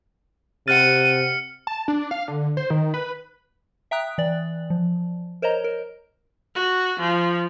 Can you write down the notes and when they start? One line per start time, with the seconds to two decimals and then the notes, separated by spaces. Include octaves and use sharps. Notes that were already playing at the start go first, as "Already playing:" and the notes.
0.68 C3 F#5 F6 F#6 A6 C#7 D#7
1.67 A5
1.88 D4
2.11 F5
2.28 D3
2.57 C5
2.70 D#3
2.94 B4
3.91 E5 G5 A#5 D#6 F#6
4.18 E3 D5
4.70 F3
5.42 A#4 C5 C#5 D#5 A#5
5.64 A#4
6.55 F#4
7.00 F3